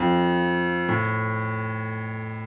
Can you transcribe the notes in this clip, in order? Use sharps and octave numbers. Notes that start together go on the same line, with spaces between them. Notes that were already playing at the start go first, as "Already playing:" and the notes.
Already playing: F2
A2